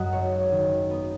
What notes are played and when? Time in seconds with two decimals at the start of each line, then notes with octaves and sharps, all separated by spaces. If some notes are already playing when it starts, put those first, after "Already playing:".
Already playing: F#2 F#3 D#5 F#5
0.13 G#1 C#5
0.52 D#3
0.91 B3